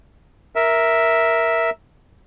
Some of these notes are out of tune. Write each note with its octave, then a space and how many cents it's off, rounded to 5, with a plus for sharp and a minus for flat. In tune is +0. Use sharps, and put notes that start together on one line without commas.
A#4 +0 E5 -5